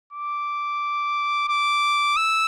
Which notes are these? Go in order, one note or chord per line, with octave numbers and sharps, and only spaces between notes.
D6
D6
E6